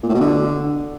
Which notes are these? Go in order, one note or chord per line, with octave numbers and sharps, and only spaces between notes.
A#2
A2
B2
D3